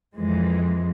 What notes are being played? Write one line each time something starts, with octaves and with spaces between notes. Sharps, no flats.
F2 E3 G#3